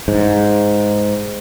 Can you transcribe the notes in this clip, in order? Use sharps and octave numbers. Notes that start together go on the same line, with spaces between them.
G#2